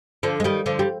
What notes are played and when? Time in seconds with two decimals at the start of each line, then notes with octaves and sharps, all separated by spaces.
0.23 D3 F3
0.40 G#3
0.44 D#3 G3
0.66 D3 F3
0.79 G3